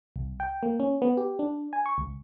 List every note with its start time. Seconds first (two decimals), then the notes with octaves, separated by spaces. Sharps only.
0.16 C2
0.40 G5
0.63 A#3
0.80 C#4
1.02 B3
1.17 G4
1.39 D4
1.73 G#5
1.86 C#6
1.98 C#2